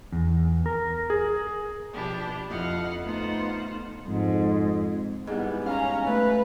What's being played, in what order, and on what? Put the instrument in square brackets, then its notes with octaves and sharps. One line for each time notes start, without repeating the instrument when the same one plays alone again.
[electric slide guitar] E2
A#4
[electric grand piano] G#4
[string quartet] B2 F3 D4 E4 G4
F2 E4 D#5 F5 F#5
A3 B3 D#4 F4 C5 F#5
[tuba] F2 [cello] G#2
[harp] G#2 G3 E4 [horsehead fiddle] B3
[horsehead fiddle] C#4 A#5 [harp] F5
[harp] A3 [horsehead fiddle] B4